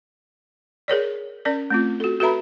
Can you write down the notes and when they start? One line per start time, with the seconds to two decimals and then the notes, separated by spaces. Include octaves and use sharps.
0.88 G#4 A#4 C#5 D5
1.45 C#4 A#4 D5
1.70 A3 C4 F4
2.00 F#4 A4
2.20 F#4 A4 B4 E5 A#5 B5